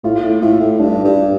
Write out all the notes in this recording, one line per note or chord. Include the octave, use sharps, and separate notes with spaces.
A2 F4
A2
A2 F4
A2
G2 D4
G2